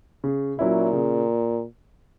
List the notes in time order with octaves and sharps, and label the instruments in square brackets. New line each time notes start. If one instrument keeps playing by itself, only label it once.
[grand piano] C#3
[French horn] A#2 [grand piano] F#3 C#4 E4
[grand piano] C#3